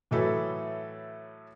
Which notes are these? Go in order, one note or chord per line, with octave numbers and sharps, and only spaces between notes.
A2 E3 F#3 A3 A4 B4